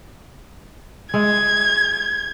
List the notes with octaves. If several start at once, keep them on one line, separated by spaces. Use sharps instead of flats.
G#3 E4 G#6